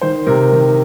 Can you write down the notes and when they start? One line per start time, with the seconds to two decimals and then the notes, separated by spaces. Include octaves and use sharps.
0.01 D#3 C5
0.27 C3 A#4
0.52 D#3